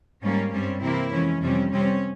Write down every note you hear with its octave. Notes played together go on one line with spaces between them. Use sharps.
G#2 G3 A#3 C#4
G2 G3 C4 C#4
C3 E3 A#3 C4 E4
F2 E3 G#3 C#4
F2 C3 G3 C4 C#4
C3 G3 C4 C#4